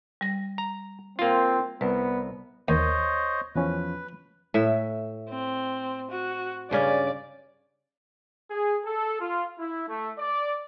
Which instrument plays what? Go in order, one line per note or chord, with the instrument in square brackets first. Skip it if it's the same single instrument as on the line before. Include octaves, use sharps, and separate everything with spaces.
[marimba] G3 A#6
[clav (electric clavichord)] A#5
[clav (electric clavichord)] A#3 F4 [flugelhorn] C4
[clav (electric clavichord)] C2 [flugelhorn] B3 [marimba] B4
[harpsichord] D#2 [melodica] C5 C#5 D#5
[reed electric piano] E2 F3 C#4 [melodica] B4
[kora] A2 E5
[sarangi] C4
F#4
[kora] G2 C#3 C#4 [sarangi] D5
[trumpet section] G#4
A4
F4
E4
A3
D5